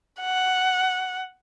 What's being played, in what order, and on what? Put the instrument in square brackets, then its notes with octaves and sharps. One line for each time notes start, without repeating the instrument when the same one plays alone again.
[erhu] F#5